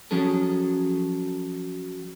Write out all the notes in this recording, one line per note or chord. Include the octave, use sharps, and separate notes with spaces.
F3 F#3 C#4 G#4 A4